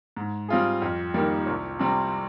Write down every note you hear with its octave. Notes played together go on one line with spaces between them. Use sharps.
G#2
G3 C4 F4 G#4
F2
D#3 G3 A#3
C2
C3 G3 C4